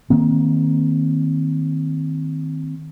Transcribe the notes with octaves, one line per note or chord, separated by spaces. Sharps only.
D#3 A#3 C4